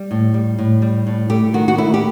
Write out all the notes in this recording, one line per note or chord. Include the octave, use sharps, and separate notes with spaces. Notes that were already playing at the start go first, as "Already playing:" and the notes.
Already playing: G3
A2
G3
A2
G3
A2
A3 G4
D#3 F#4
F#4
A3 E4
G4